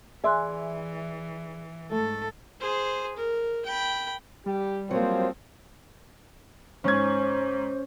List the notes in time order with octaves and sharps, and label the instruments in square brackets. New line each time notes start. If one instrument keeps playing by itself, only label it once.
[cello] E3 [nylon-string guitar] G#4 D5 E5 [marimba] G#5 C6 F#6
[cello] G#2 A4 [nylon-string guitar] A3
[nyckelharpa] G#4 C5
A#4
G5 B5
[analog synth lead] G3 [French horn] G4
[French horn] F3 [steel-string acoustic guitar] F#3 A#3 [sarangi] C4
[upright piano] G#2 G#6 [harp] C#4 [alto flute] C5